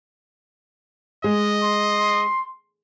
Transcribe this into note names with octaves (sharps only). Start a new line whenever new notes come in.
G#3 D#5
C6